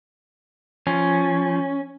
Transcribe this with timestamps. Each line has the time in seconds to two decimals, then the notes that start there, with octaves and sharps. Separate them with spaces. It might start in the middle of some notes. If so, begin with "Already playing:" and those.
0.87 F3 C#4